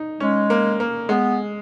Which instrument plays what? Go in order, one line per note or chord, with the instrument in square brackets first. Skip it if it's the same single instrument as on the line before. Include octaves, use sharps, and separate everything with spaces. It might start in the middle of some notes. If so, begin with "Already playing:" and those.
Already playing: [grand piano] D#4
[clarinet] G#3 [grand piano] C#4
[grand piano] A#3
A#3
[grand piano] G#3 [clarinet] B3